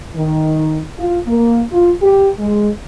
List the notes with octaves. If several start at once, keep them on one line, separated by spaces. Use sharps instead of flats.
D#3
F4
A#3
F4
G4
G#3